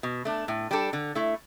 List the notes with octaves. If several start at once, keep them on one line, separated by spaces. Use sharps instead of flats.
B2
A3 D4
A2
G3 D4 A4
D3
A3 E4